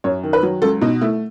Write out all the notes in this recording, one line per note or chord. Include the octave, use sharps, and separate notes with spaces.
F#2 C#5
D#3
B4
F#3
C#2 A4
B2 D#4
A3 E4